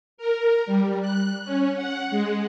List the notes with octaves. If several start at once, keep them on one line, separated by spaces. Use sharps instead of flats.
A#4
G3
F#6
C#4
F#5
G#3